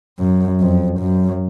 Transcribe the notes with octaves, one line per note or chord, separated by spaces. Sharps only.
F#2
F2
F#2